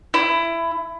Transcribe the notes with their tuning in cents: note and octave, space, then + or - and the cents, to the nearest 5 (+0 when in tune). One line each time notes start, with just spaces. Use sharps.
E4 +15